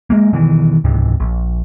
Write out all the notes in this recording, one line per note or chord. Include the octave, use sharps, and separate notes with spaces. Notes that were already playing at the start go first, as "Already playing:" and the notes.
G#3 A#3
B2 D#3 E3
C#2 G#2 C3
A#1